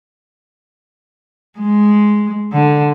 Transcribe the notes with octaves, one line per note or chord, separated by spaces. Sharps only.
G#3
D3